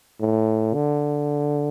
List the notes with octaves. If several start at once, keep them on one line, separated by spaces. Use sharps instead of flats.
A2
D3